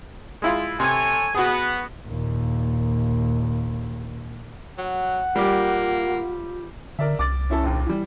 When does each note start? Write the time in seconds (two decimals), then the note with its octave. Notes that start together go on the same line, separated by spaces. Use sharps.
0.42 G#3 E4 F4
0.80 C3 A4 C#5 G#5
1.35 B3 F#4 G#4
2.07 D#2 A#2
4.78 F#3 F#5
5.36 G3 A#3 F4 G4
6.99 D3 A#4 D5 E5
7.19 C2 D6 A6
7.50 C#4 E4 A4
7.64 A#1 D#2
7.86 E3 G3